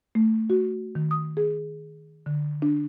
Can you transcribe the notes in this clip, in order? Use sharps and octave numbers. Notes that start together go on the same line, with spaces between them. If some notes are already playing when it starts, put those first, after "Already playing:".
A3
F#4
D#3
D#6
G#4
D3
D4